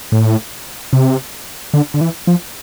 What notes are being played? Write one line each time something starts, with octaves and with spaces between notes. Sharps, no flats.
A2
C3
D3
D3
E3
F3